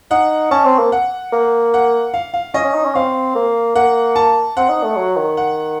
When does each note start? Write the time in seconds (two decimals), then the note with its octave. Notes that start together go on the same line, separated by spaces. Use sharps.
0.11 D#4 F#5
0.51 C#4 A5
0.65 C4
0.79 A#3
0.92 F#5
1.33 A#3
1.74 F#5
2.14 F5
2.34 F5
2.54 C#4 D#5
2.65 C#4
2.75 D#4
2.85 C#4
2.95 C4 F5
3.35 A#3
3.76 A#3 F#5
4.16 A5
4.57 C4 F#5
4.70 D#4
4.84 A3
4.97 F#3
5.17 D#3
5.37 F#5